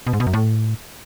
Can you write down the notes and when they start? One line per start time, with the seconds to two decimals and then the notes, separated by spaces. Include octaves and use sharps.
0.07 B2
0.13 G#2
0.20 B2
0.27 F#2
0.33 A2